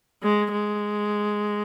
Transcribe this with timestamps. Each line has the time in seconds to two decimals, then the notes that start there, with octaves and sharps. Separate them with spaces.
0.22 G#3
0.51 G#3